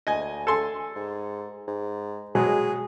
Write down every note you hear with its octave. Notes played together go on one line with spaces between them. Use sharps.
D2 D#5 G#5
A4 G#5 C6
G#2
G#2
B2 F#3 G#3 G#4